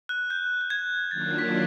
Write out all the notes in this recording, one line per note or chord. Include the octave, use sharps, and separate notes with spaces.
F#6
G6
G6
G#6
D#3 F#3 A#3 D4 F4 A6
B6